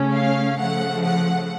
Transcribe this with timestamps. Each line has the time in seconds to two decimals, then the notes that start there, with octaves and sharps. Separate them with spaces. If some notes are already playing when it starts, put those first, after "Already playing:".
Already playing: C#3 A3 C#4
0.14 F5
0.59 C#3 F3 A3 F#5
1.05 F#5